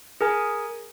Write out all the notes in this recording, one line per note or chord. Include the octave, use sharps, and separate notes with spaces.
G#4 A#4 G#5